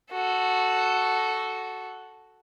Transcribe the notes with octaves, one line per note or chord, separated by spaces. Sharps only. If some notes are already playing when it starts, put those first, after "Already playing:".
F#4 A4